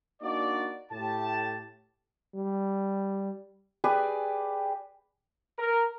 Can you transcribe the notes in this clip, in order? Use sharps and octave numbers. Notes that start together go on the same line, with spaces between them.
A#3 D4 D#4 F#4 D5
A2 G4 A5
G3
G4 G#4 B4 D5
A#4